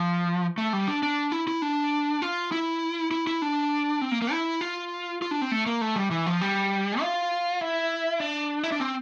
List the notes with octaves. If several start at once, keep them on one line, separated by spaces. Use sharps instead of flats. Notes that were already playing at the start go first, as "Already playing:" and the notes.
Already playing: F3
A3
G3
D4
D4
E4
E4
D4
F4
E4
E4
E4
D4
C4
A#3
A#3
E4
F4
F4
D4
C4
A3
A#3
A3
G3
E3
F3
G3
F4
E4
D4
E4
D4
C4